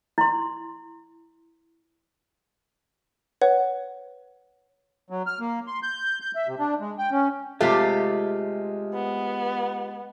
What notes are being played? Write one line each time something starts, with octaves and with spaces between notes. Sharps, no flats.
E4 C6
B4 C#5 F#5
F#3
F6
A#3
C6
G6
G6
E5
C3
D4
G#3
G5
C#4
C3 G#3 A3 F4 G4 F5
B3